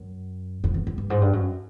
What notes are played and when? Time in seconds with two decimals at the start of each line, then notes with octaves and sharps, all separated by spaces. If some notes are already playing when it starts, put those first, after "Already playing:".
Already playing: F#2
0.64 F2
0.74 E2
0.87 F#2
0.98 G2
1.10 G#2
1.22 G2
1.33 F#2